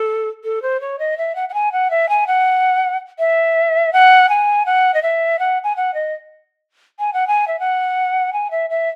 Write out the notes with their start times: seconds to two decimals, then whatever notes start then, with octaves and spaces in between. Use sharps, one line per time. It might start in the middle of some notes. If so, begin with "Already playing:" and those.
Already playing: A4
0.44 A4
0.62 C5
0.81 C#5
0.99 D#5
1.18 E5
1.35 F#5
1.49 F#5
1.54 G#5
1.72 F#5
1.90 E5
2.09 G#5
2.27 F#5
3.19 E5
3.93 F#5
4.29 G#5
4.66 F#5
4.94 D#5
5.02 E5
5.39 F#5
5.64 G#5
5.76 F#5
5.94 D#5
6.99 G#5
7.14 F#5
7.27 G#5
7.48 E5
7.59 F#5
8.33 G#5
8.51 E5
8.70 E5